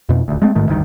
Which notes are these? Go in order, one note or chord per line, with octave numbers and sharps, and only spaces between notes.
F2 B2
D#1 D2
G#3 A3 C4
A1 G#2 D#3 A3
F#1 D2 G2 D#3